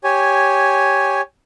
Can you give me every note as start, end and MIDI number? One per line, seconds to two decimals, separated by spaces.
0.04 1.21 67
0.04 1.21 73
0.04 1.21 80